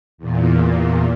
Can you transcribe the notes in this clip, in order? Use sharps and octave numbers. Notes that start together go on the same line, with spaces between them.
E2 A#2